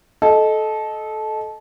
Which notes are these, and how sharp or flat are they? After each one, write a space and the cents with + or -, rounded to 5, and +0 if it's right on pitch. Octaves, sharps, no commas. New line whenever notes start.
A4 -20 D#5 +0